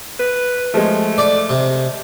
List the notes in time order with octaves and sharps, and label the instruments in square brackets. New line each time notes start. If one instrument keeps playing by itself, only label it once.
[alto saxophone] B4
[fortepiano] F3 G#3 [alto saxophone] A3
[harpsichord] D5 D6
C3